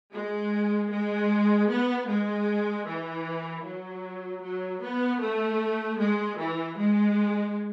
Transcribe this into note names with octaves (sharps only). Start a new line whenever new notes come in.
G#3
G#3
B3
G#3
E3
F#3
F#3
B3
A3
G#3
E3
G#3